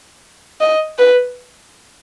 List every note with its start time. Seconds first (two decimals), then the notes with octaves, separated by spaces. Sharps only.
0.61 D#5
0.98 B4